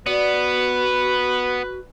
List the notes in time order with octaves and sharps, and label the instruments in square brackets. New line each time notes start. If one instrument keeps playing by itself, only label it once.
[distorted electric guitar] B3 [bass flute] F#4 [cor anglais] B4 [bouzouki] D5